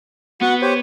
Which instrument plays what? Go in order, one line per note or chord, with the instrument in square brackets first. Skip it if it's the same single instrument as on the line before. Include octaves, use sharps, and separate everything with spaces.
[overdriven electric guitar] B3 [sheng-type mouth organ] F#4 F#5
[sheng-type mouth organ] G4 C5 C#5